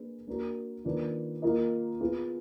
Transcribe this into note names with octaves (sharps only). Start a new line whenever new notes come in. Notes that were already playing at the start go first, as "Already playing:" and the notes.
Already playing: A#3 D4 G#4 B4
A#3 D4 F#4 A#4
D#3 A#3 D4 F4 B4
A#3 F4 A#4 D#5
B3 F4 G#4 B4